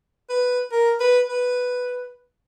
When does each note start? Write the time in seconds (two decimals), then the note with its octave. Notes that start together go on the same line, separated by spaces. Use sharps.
0.29 B4
0.72 A#4
1.00 B4
1.28 B4